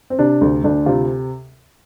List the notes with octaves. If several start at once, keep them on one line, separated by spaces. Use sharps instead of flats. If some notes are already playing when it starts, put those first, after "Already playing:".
C4
C3 D4
D2
D2 D4
C3 F4